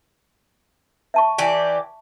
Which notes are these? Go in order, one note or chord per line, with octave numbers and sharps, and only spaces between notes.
E5 A5 C#6
E3 G4 D5